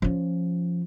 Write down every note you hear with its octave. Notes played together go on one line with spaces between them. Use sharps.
F3 C#4